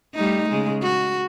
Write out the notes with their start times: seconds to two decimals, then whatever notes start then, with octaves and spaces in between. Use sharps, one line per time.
0.15 G3 A3 D#4
0.49 C#3 G#3
0.82 F#4